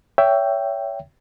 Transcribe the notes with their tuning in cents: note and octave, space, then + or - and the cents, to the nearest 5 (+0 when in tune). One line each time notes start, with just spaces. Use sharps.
C#5 +25 E5 +10 G5 +0